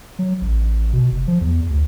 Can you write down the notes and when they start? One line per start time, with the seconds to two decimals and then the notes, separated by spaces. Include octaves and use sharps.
0.19 F#3
0.41 A1
0.93 B2
1.12 F1
1.28 F3
1.41 E2
1.70 D2